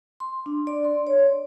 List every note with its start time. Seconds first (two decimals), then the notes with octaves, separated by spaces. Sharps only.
0.20 C6
0.46 D4
0.67 D5
0.84 C6
1.07 C#5